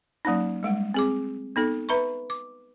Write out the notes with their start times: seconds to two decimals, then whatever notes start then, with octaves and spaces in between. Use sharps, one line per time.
0.25 F#3 A#3 C#4 D#4
0.63 G3 G#3 F#5
0.94 C4 G#4 D6
1.56 B3 D#4 A4
1.89 B4 E5 A#5 B5 C#6
2.30 D6